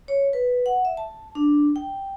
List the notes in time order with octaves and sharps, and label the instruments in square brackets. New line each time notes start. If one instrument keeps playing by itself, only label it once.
[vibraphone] C#5
B4
F#5
E5
A5
D4
G5